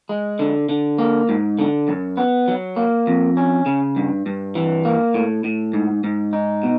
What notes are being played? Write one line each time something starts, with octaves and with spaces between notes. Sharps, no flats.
G#3
D3
D3
A#3
G#2
D3
F#2
B3
F#3
A#3
F2
C#4
C#3
G2
G2
E3
A#3
A2
A2
G#2
G#2
D#4
B2